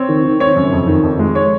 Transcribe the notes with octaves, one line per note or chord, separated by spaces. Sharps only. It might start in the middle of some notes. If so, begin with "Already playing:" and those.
Already playing: C4 C#5
D#3
D#3
C4 C#5
F#2
F2
D#3
F2
G#3
C#5